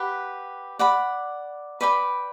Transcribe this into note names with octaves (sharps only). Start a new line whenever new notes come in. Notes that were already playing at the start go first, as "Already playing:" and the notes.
Already playing: G4 B4 F#5
D5 F#5 B5
B4 D5 G5 B5